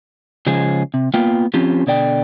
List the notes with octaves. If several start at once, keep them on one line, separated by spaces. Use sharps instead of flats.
C#3 F3 G#3 G#4
C3
A#3 B3 F4 G5
F3 C4 C#4 F4 G4
B2 D3 D5 G5